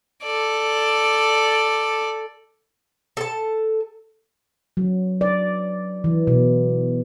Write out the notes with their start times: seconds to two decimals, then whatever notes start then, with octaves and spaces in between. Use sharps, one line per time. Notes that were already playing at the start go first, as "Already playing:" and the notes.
0.23 A4 D5
3.17 A4 A5
4.77 F#3
5.21 D5
6.04 E3
6.27 B2